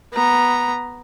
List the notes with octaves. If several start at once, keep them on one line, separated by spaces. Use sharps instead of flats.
B3 A#5